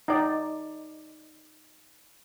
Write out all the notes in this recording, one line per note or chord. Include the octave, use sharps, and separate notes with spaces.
D#4 D5